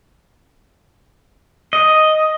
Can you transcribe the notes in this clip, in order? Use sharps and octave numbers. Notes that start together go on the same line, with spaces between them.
D#5